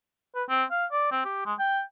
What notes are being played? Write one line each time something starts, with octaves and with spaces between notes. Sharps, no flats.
B4
C4
F5
D5
C4
G4
G#3
G5